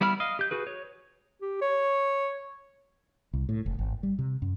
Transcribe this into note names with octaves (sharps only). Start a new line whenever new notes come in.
G3 B3 E4 B5 F6
D#5 F5
G4 G6
F#4 G#4 B4
C#5
G4
C#5
C2
A2
F1
G#1
G3
C3
F#2